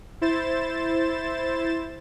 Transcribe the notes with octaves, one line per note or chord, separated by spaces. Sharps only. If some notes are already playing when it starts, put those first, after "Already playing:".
E4 C5 A6 E7